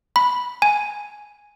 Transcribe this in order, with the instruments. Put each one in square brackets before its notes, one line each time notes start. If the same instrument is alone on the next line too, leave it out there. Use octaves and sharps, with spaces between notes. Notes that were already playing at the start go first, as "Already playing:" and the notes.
[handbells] B5
G#5